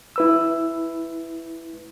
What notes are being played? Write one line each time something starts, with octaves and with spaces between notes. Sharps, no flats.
E4 B4 E6